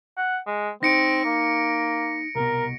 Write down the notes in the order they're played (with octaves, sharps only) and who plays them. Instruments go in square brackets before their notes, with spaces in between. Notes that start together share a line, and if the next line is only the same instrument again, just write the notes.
[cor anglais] F#5
G#3
[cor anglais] C4 [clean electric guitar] D#4 [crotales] A#6 C#7 D7
[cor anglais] A#3
[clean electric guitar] C2 B2 [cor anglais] A#4